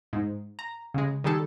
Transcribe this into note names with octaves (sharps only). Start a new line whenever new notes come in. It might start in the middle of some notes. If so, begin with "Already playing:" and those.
G#2
A#5
C#3 G#3
D#3 G3 G#4 A4